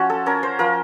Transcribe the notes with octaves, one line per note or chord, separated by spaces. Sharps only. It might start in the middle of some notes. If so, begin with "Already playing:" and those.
Already playing: F3 C#4 F#4
A4
C#4 A#4
C5
F3 A#4